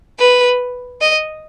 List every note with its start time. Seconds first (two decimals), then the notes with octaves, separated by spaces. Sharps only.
0.19 B4
1.01 D#5